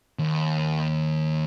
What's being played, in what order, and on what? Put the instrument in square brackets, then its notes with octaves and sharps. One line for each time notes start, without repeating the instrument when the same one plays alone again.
[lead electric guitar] D#2